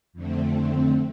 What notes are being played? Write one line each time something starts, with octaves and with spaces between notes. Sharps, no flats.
F2 D3 A3 C4